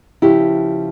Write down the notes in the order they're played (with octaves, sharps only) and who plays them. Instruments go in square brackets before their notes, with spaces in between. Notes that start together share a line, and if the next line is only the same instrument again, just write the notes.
[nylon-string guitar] C#3 F3 E4 G4